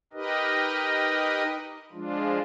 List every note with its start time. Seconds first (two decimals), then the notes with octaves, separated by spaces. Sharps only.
0.13 D#4 G4 A#4 B4 D#5
1.93 F3 G#3 D4 F4